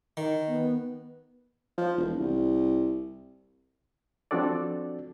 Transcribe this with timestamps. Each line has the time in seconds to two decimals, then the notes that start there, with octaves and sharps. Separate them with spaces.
0.17 D#3
0.48 B3
1.78 F3
1.98 E1
2.19 C2
4.31 F3 C4 D4 F#4 A4 D5